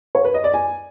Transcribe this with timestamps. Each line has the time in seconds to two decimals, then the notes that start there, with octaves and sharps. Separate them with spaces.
0.15 C#5
0.24 B4
0.34 D#5
0.44 D5
0.54 G#5